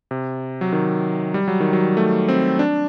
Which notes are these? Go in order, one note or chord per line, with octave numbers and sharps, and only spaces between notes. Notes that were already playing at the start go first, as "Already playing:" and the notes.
C3
F#3
D#3
G3
F#3
D#3
F#3
A3
C4
D4